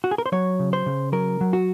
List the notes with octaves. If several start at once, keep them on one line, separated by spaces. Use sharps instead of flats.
F#4
G#4
A#4
C5
F#3 C#5
C#3
C5
C#3
F#3 A#4
F#3
F#4